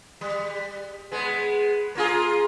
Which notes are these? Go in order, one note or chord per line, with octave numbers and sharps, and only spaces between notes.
G3
G#3 B3
A#3 F4 G#4